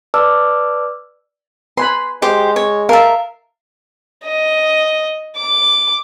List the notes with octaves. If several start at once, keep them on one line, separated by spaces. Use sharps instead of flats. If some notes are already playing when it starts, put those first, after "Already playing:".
B4 D5 A5 D6 E6 F6
B4 G#5 B5 C6
G#3 G4 C5
C#5
A#4 E5 F5 A5
D#5
D6